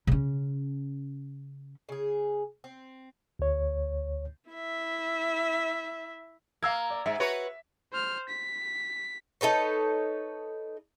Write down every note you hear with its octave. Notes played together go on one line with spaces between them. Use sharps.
C#3 C#4
C#3 G#4
C4
D2 C#5
E4 E5
A#3 F5 E6 G#6
D5
G#2 E5
F#4 B4 C#5
C5 F6
B6
D#4 A4 B4 C#5